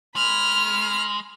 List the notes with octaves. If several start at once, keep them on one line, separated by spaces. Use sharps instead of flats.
G#3 B5 F6